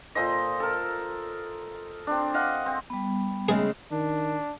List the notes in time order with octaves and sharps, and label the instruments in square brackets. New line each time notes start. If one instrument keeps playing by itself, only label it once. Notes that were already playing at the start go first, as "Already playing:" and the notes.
[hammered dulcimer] A#2 A4 C5 D#5
A4 A#4
C4 D4
D#5 F5 F#5
C4
[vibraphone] G3 B3
[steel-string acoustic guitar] C#3 G#3 A3 [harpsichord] G#4
[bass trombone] D#3 [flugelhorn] D4